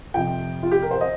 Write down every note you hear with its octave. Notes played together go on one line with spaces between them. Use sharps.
F2 C3 F3 G5
F4
G4
A#4
C5
D#5